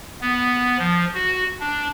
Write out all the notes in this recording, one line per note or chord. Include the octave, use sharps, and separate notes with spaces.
B3
F3
F#4
D4